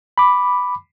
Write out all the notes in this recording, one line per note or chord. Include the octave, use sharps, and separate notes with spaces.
B5 D6